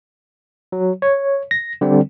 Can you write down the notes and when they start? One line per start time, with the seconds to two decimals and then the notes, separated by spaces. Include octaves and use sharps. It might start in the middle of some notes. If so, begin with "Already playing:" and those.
0.72 F#3
1.02 C#5
1.51 A#6
1.81 D3 G3 C4